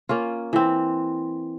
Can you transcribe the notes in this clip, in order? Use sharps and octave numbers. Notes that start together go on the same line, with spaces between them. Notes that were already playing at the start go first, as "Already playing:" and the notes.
A#3 C#4 F4
E3 C4